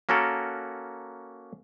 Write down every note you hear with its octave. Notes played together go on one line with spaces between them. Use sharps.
A#3 C#4 F#4 A4 A#4